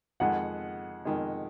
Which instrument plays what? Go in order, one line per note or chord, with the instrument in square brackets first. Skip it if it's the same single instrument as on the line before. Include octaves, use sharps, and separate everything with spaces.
[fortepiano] F2 D#3 G#3 [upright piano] F#5
[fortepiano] F2 D#3 G#3